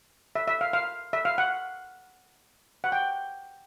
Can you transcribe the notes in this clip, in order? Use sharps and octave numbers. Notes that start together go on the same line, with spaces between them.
E5
E5
F5
F5
E5
F5
F#5
F#5
G5